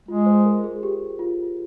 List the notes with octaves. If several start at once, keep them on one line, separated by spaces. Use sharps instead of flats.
G#3 F4
C5
A#4
G#4
G4
F4